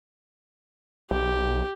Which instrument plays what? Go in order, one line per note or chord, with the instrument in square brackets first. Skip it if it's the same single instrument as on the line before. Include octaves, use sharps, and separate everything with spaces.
[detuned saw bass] B1 [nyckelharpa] G4